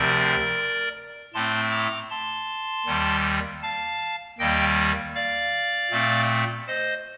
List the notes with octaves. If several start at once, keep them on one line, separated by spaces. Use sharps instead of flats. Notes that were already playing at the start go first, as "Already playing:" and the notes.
Already playing: D2 C3 F3 C4 A#4 D5
A2 A3 C4 A5 C6
A#5 D6
A5 C6
D#2 D#3 G3
F5 A5
D#2 D#3 G3 A#3 D#5 G5
D5 F5
A#2 A3 C4
C5 D#5